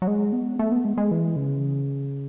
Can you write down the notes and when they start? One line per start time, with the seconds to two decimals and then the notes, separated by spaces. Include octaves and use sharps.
0.02 F#3
0.07 G#3
0.33 B3
0.59 A3
0.72 B3
0.85 G#3
0.98 G#3
1.11 E3
1.36 C#3